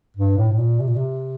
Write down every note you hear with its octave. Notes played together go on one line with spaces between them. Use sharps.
G2
A2
A2
A#2
C3
A#2
C3